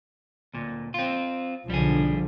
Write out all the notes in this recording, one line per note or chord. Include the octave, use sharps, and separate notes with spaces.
D2 A#2
C4 F4
B1 D3 F3 G3 G#4